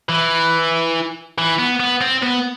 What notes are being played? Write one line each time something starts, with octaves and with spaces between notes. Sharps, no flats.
E3
E3
B3
B3
C4
B3